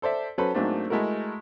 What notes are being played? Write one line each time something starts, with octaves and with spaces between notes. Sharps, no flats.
A4 C5 D5 E5
F#3 C#4 A4 B4 C5
G#2 F#3 A3 A#3 C4 D4
G#3 A3 E4 F#4 A#4